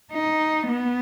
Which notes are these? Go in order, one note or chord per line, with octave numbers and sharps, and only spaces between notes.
D#4
B3